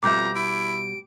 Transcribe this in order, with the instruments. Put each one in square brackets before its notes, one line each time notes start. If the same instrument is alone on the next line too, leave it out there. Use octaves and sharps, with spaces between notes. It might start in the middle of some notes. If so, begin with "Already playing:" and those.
[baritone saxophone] F2 [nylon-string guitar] B2 G3 E5 [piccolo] A#5 [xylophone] D6 G6
[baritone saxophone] E4 [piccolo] D7